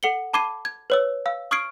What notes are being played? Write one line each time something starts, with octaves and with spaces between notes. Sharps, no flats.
A4 F#5 C#7 F#7 G7
A5 B5 D6 G#6 C7 D#7
G#6
B4 C#5 E6
F5 E6
C#6 D#6 F6 G#6 C7 D7